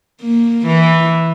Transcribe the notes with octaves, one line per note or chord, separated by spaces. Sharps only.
A#3
E3